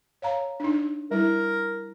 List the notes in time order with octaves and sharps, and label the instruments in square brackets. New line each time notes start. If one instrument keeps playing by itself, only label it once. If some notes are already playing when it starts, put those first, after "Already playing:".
[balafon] C#5 F5 A#5
D4 D#4
[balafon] G3 E4 [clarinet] A#4